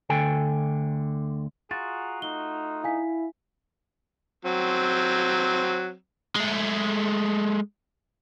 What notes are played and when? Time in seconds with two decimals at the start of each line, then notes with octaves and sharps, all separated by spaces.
0.09 D2 D3 A4 G5 G#5
1.71 F4 F#4 G#4 A#5 A6
2.22 A3 D#4 G7
2.84 E4 F5 G#5 B6
4.45 F#3 C4
6.36 G#3 A3